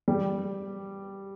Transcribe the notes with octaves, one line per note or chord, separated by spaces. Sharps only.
G3